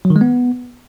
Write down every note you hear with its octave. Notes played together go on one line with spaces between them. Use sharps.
F#3
D#3
G#3
B3